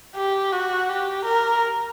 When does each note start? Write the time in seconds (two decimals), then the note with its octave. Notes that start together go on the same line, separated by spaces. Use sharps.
0.15 G4
0.52 F#4
0.89 G4
1.25 A#4